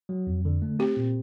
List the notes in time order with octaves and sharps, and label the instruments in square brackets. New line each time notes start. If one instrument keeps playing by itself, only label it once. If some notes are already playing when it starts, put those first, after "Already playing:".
[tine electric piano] F#3
F2
D3
A3
[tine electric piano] C4 [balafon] G4
[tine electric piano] A#2